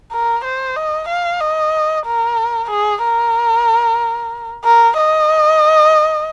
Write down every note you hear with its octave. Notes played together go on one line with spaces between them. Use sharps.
A#4
C5
D#5
F5
D#5
A#4
G#4
A#4
A#4
D#5